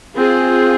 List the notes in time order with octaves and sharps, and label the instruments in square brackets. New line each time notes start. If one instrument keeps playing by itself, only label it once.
[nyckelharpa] C4 [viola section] F4 G#4